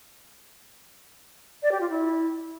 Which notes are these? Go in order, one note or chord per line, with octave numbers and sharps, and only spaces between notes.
D5
G4
F4
E4